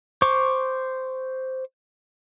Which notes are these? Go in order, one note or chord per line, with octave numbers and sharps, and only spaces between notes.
C5 C#6 D6